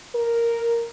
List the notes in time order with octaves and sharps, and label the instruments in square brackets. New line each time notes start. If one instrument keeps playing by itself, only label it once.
[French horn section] A#4